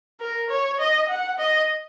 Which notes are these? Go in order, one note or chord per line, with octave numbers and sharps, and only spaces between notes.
A#4
C#5
D#5
F#5
D#5